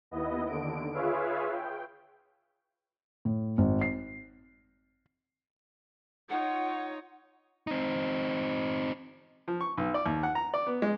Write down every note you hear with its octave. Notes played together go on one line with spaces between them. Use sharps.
D#2 B3 E4 D#5
D#2 D3 D7
F4 G#4 B4 C#5 E5 F5
G5
A2
G#1
C7
D#4 F4 C#5 F#5
C4 D#4
F3
C#6
B1
D5
D#2
F#5
A#5
D5
B3
G#3